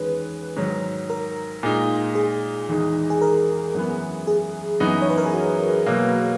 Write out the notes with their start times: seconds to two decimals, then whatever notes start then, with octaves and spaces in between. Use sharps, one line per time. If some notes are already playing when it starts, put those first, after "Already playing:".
Already playing: E2 D#3 G#3 C#4 B4
0.56 G#2 D#3 F#3
1.10 A#4
1.63 A#2 G#3 D#4
2.15 G#4
2.69 E2 D#3 G#3 D#4
3.10 G#4
3.21 A#4
3.75 F#2 E3 G#3 B3
4.27 G#4
4.80 F#2 E3 B3 D#4
5.02 C#5
5.10 B4
5.18 A#4
5.26 G#4
5.33 F#4
5.86 B2 F#3 A#3